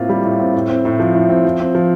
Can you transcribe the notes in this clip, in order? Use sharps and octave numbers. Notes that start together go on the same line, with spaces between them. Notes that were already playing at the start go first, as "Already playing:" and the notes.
Already playing: A2 A#3 C4 F4
G3
A2
C4
A2
C4
A2
F3
A2
C4
F3
C4
F3